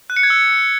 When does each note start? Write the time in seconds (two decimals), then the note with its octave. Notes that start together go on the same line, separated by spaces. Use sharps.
0.10 F#6
0.16 C#7
0.23 G#6
0.30 E6